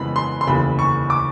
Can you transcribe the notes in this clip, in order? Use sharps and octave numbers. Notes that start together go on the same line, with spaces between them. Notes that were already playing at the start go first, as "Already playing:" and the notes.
Already playing: F2 C#3 E3 G#3 B3 B5
C6
C6
F1 D#2 C#3 E3 B5
C#6
D6